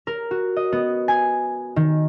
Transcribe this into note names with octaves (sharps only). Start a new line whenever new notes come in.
A#4
F#4
D#5
B3
G#5
D#3